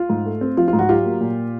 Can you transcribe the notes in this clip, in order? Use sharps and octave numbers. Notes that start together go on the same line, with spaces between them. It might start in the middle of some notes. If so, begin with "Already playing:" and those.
Already playing: F4
G#2
A3
C4
F3 F4
F4
G#2
F#4
F#3 F4 G4
A#3
A#2